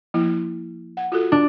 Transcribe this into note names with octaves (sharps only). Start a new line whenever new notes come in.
F3 A#3 E4
F#5
F4 F#4 A4
D4